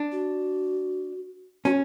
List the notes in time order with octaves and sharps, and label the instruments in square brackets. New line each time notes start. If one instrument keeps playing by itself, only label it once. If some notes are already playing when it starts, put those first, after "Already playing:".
Already playing: [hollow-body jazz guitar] D4
[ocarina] F#4
[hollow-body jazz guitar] C#4 [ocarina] F#4